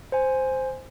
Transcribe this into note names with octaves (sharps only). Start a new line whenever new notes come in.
C5 G#5